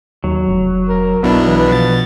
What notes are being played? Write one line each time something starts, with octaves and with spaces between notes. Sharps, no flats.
D#2 F#3
F1
A#4
B1 B2 B3 D4 E4
E3 B4
B2 F3 A6